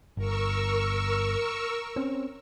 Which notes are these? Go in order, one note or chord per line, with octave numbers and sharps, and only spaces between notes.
G1 A#4 C#6 E6
C4 C#4